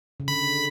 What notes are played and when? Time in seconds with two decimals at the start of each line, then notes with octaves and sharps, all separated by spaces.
0.20 C#3
0.28 D3 B5